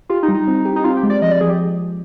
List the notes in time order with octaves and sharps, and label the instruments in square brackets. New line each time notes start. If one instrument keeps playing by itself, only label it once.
[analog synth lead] F4 [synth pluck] G4
[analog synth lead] D#4
[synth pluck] G3
[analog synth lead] D#4
[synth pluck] C4
G4
[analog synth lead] D#4
[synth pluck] C4 [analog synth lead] F4
[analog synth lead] G4
[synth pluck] G#3
[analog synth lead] D5
[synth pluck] F3 [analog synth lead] D#5
[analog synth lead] D5
[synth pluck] F3 [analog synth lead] G#4
[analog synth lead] G4